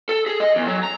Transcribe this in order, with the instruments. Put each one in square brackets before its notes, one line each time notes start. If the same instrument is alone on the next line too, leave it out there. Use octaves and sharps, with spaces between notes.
[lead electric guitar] A4
G#4
D#5
E2
F#3
A#5